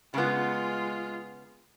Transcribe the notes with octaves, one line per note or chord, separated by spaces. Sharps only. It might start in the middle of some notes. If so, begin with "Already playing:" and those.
C#3 G#3 B3 F4